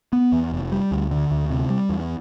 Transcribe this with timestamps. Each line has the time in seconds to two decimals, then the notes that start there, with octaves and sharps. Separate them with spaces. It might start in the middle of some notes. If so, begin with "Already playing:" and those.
0.13 B3
0.32 E2
0.52 F1
0.72 G3
0.91 D2
1.11 D3
1.31 D2
1.50 C3
1.70 G3
1.89 E2